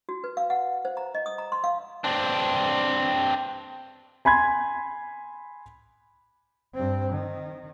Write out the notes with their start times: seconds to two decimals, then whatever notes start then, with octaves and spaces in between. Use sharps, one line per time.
0.09 F#4
0.24 B4
0.37 F5
0.50 F#5
0.85 C5
0.97 A#5
1.15 D#5
1.26 D#6
1.38 A#5
1.52 C6
1.64 F5
2.04 C4 D4
4.25 G#5 B5 C6 G#6
6.74 G2 C4
7.13 D#3